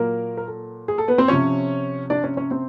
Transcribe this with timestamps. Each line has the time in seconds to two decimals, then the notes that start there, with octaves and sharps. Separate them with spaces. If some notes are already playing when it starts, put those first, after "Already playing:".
Already playing: A#2 F#3 A#3 A#4
0.37 A#4
0.47 A4
0.88 G#4
0.98 A4
1.08 B3 B4
1.18 C4 C5
1.28 C3 F3 C#4 C#5
2.10 D4 D5
2.24 C#4 C#5
2.37 C#4 C#5
2.51 C4 C5